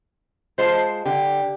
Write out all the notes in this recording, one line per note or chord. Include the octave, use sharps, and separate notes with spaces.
G#3 F4 C5 A5
D3 G4